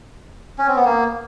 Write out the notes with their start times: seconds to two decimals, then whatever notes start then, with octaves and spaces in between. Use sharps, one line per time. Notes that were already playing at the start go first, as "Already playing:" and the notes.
0.59 C#4
0.68 C4
0.77 B3
0.85 A#3